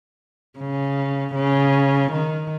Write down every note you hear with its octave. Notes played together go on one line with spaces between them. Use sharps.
C#3
C#3
D#3